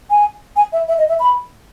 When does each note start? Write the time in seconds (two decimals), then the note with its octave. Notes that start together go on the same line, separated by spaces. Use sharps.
0.10 G#5
0.56 G#5
0.73 E5
0.88 E5
0.98 D#5
1.09 E5
1.20 B5